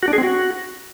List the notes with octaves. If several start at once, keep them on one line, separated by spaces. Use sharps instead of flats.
F#4
D4
G#4
C4
F#4